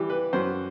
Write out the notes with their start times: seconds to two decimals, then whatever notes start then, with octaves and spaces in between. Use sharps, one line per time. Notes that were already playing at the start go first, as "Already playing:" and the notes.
Already playing: E3 G3 G4
0.10 B4
0.33 F#2 C5